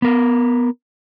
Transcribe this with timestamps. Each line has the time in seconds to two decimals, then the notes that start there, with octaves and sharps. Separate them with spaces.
0.02 B3 A#4